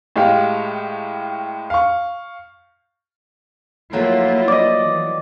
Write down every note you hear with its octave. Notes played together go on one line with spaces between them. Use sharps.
A2 G#3 G4 F5
F5 C#6
F3 F#3 A3 A#3 E4 F4
D5 D#5
E3